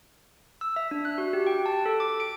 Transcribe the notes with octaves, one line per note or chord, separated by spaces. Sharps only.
E6
E5
D4
F#6
F#4
G4
G5
A5
A4
D6
D7